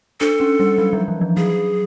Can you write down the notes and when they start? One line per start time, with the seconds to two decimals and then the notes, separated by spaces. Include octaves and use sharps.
0.20 D4 A4
0.40 C#4
0.60 G3
0.78 F#3
0.93 F3
1.08 E3
1.21 F3
1.37 F#3 G#4